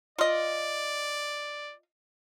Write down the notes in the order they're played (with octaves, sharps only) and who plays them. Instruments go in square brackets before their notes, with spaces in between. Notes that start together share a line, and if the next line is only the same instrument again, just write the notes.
[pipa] F4 D#5 [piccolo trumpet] D5